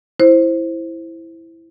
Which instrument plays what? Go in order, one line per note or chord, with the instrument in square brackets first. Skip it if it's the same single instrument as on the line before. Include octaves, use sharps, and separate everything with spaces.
[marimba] E4 C5